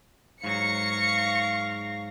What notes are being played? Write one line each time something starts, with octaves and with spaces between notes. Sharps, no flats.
G#2 F#3 F5 C#6 A#6 C#7